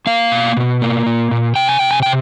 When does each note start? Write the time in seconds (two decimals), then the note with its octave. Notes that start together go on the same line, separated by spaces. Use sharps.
0.07 A#3 F5
0.32 B2
0.57 B2
0.82 A#3
1.06 A#2
1.31 A#2
1.56 C3 G5
1.68 G#5
1.79 C3 G5
1.91 G#5
2.03 C3 G5